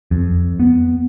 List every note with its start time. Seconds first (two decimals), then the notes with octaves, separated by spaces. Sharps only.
0.11 F2
0.60 B3